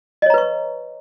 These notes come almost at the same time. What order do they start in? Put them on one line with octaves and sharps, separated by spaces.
D#5 C#5 A#5 B4 C#6